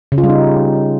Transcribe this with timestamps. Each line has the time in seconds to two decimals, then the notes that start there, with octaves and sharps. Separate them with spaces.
0.12 C#3
0.18 F4
0.24 G3
0.29 D#4